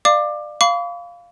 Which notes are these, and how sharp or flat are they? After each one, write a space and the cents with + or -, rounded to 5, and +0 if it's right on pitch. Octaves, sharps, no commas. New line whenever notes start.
D5 +30 F5 +0 D6 +15
F5 +0 B5 +20 D6 -45